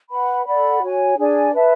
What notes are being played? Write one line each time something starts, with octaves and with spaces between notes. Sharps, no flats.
B4 F#5 B5
A4 D5 F#5 B5
F#4 C#5 G#5
D4 G#4 D5 G#5
B4 E5 A5